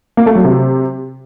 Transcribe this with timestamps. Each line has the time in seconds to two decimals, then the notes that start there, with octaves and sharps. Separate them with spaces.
0.17 A#3
0.26 A3
0.35 F#3
0.44 C3